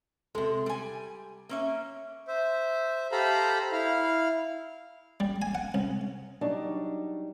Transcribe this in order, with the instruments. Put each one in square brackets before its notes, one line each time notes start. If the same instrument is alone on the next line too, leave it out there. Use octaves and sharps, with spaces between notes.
[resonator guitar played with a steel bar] C3 G#3 [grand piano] A4
[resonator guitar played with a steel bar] G3 G#5
A#3 C#4 E5
[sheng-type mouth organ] C5 E5
G4 A4 C5 F5 A#5 B5
E4 F5
[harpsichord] G3
G#5
F#5
C2
[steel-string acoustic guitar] F#3 G3 D4 D#4